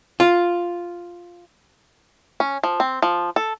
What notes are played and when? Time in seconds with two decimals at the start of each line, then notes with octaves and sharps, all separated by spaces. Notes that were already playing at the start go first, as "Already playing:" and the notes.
0.20 F4
2.40 C#4
2.63 F3
2.80 C4
3.02 F3
3.36 A4